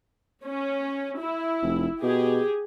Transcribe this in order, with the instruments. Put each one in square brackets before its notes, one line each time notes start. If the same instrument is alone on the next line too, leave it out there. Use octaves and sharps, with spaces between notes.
[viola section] C#4
E4
[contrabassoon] F1
[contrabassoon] B2 [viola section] G4 G#4